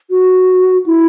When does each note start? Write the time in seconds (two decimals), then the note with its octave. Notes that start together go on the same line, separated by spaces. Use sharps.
0.10 F#4
0.86 E4